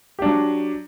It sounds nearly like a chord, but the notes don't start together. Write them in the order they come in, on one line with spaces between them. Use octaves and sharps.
G4 D4 F#3